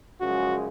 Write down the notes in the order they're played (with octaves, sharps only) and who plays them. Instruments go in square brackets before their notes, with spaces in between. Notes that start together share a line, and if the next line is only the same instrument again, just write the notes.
[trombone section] F#2 C#3 F3 G#3 F#4